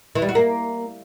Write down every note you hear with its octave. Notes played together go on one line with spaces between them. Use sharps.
E3
G3
F#4
A#3